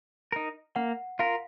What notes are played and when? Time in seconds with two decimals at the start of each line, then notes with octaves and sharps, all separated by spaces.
0.32 D#4 A#4
0.76 A#3 F#5
1.19 F4 A#4 F5